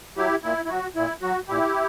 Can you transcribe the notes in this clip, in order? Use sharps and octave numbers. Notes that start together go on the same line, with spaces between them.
F#3 E4 G4
A#2 E4
E4
F#3 F#4
A#2 E4
F#3 F#4
A#2 E4 G4